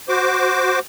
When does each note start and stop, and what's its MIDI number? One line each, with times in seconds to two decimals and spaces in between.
0.09 0.79 66
0.09 0.79 72
0.09 0.79 86